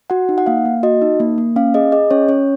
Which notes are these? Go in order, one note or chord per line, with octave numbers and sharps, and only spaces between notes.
F#4 F#5
D#4
F#5
A#3 F5
A#3
F#4 D#5
D#4
A#3
A#3
C#4 F5
G#4 D#5
G#4 D#5
C#4 C#5
C#4 C#5